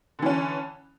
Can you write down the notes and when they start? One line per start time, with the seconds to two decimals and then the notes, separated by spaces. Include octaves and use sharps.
0.19 D3
0.22 E3
0.26 C#4